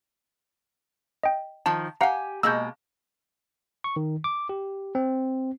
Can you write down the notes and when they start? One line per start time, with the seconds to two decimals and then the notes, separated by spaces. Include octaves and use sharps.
1.23 D#5 G5
1.66 D#3 F3 A5
2.01 G4 F5 F#5 G#5 A#5
2.43 B2 G#3 A#3 E6 G6
3.84 C#6
3.96 D#3
4.24 D6
4.49 G4
4.95 C4